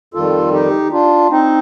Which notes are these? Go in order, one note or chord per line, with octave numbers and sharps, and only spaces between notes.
F2 D#3 G3 F4 A4
D#4 G4
D4 F4
C4 D#4